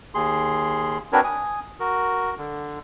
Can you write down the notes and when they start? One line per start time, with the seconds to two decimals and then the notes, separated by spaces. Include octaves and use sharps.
0.15 D#2 G#4 C6
1.13 C4 D4 F#4 A#4 B4 C#5
1.24 G#5 D#6
1.80 F#4 A#4
2.38 D3